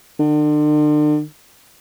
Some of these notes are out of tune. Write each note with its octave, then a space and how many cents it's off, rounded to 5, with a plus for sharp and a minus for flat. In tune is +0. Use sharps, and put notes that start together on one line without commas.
D3 +40